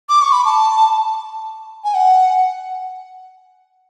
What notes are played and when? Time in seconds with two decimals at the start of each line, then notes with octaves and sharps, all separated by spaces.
0.09 D6
0.22 C#6
0.32 B5
0.45 A5
1.84 G#5
1.94 F#5